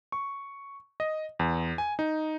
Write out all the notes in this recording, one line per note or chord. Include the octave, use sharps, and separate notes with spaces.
C#6
D#5
E2
G#5
D#4